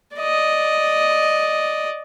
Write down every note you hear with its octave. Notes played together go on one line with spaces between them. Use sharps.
D5 D#5